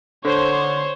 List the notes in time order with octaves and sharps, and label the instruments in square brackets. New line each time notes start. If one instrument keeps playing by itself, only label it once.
[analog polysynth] D3 [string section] C5 [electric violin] C#5